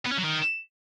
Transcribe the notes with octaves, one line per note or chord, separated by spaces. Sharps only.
B3
C#4
F#3
D#3